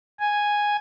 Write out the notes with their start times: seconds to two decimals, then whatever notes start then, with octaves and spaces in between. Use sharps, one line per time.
0.20 G#5